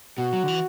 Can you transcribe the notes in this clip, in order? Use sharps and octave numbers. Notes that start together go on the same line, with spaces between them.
B2 F#4
F#3
D3
E3